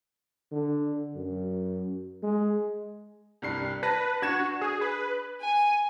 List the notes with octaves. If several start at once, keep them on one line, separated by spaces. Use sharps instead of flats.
D3
F#2
G#3
C2 G2 C7
B4 A5 A#6
D4 F#4 G#6 E7
G#4
B4
G#5